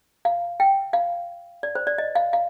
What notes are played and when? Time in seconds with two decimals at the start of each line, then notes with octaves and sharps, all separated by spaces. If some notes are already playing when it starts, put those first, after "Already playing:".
0.25 F5
0.60 G5
0.93 F5
1.63 D5
1.75 C5
1.87 D5
1.98 D#5
2.15 F5
2.33 F5